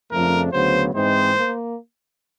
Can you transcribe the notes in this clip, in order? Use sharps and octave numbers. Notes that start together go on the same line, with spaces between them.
F2 C#3 F3 A3 D4 A#4
D2 C#3 F#3 B3 C5
G#2 E3 G#3 C4 D#4 C5
A#3